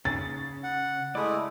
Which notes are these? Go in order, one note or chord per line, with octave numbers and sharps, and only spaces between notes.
C#3 A6
F#5
G#3 A3 E4 D5 D#6